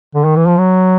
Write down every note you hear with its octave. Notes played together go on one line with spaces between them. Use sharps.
D3
D#3
E3
F3
F#3